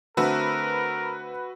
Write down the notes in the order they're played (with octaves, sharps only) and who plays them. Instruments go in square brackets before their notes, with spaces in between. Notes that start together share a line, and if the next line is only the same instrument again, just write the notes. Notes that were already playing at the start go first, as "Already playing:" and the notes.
[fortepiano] D3 A3 C4 [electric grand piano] F#4 B4 E6 [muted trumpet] A#4